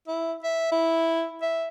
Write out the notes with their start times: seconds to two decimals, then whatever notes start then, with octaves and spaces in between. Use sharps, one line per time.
0.08 E4
0.44 E5
0.72 E4
1.42 E5